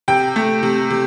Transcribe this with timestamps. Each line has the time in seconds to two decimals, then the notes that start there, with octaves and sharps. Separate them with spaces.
0.08 C3 G5
0.36 A3
0.63 C3
0.90 C3